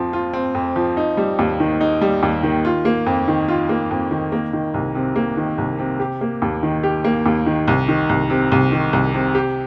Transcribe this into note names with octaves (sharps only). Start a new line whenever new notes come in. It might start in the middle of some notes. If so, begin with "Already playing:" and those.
Already playing: F2 F3 C4
F4
C4
F2
F3
D#4
G3
D#2
D#3
D#4
G3
D#2
D#3
F4
A#3
F2
D#3
F4
A#3
F2
D#3
A#3
D#3
C2
C3
A#3
D#3
C2
C3
G4
A#3
D#2
D#3
G4
A#3
D#2
D#3
C2
D#3
C2
C3
C2
D#3
C2
C3
G4